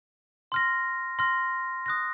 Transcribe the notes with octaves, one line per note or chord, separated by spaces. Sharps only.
C6 F6 A#6
C6 F6 A#6
D#6 F#6 A#6